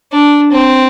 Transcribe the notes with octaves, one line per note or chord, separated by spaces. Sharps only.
D4
C4